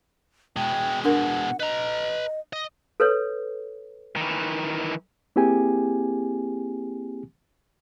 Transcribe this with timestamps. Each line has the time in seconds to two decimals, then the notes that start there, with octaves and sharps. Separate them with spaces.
0.57 B2 G#3 G5 A5
1.05 D4 A#4 F#5
1.60 B4 D#5 A#5
2.53 D#5
3.00 A4 B4 C#5
4.16 D#3 E3
5.36 A#3 C4 E4 G4 G#4 G#5